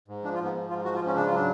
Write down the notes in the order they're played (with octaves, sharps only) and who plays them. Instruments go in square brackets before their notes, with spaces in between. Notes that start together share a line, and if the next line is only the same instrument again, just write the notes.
[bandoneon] G#2
F3 D4
F4
G#2
B3
F3
G#2 F4
F3 F#4
F4
G#2
C#4
C#3 D4
F4
F#3 D4